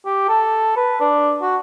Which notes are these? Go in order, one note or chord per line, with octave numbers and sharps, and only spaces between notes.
G4
A4
B4
D4
F#4